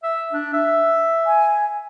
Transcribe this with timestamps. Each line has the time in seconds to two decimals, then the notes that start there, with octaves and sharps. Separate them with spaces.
0.03 E5
0.32 D4
0.54 E5
1.26 G#5